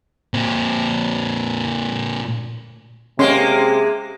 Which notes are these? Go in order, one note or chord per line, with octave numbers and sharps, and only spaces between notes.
A#2 C4
C3 G#3 A#3 C#4 C6